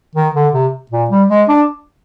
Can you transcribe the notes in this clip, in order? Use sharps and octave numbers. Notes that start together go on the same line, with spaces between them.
D#3
D3
C3
A#2
G3
G#3
D4